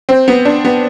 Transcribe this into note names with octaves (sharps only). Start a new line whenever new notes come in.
C4
B3
D4
B3